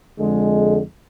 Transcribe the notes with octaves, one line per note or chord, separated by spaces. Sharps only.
F2 D3 G#3